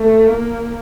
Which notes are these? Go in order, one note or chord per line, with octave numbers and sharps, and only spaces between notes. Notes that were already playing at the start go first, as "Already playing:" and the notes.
Already playing: A3
A#3